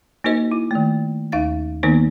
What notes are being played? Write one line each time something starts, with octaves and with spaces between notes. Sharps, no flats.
A#3 D#4 F#4 A#4 C5 D#5
E4
D#3 A3
D#2 D#4 F5 A6
D#3 A#3 B3 D#4 A#4 C5